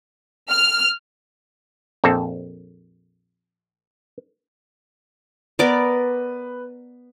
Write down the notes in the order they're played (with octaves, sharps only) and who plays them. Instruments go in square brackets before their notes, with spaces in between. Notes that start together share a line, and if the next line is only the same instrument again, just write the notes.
[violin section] F6
[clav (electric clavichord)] A#1 F2 C4 A4
[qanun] B3 A#4 D5 [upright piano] B4